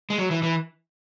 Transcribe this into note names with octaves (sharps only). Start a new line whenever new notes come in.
G#3
F#3
E3
E3